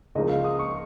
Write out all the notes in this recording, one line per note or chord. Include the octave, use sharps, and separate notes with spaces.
C#2 C#3 F3 A#3 D#5
F5
D#6
C#6